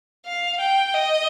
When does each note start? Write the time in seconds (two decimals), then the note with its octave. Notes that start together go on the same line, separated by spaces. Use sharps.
0.26 F5
0.60 G5
0.94 D#5